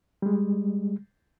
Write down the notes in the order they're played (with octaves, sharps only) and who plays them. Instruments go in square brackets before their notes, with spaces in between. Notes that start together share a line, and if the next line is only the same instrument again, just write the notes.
[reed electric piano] G3 G#3